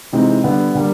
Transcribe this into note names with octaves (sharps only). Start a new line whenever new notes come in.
C3 E3 G#3 C4 D#4
D3 G3 B3
D3 G3 A#3